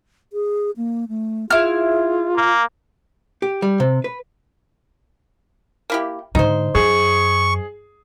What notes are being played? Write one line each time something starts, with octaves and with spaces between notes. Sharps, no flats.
G#4
A#3
A3
E4 F4 G#4 F6
A#3
G4
G3
C3
B4
A#3 E4 G4
G#2 D3 D#4 C5
F#2 G#4 C#6